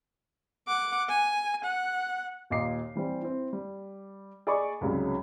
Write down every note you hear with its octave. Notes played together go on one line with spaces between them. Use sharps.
F#5 D6
G#5
F#5
D#2 A#2 D#5 D6 C7
E3 G3 C4 G4
C4 E4
G3
G#4 D5 D#5 B5 C#6 D6
C2 G#2 C#3 F#3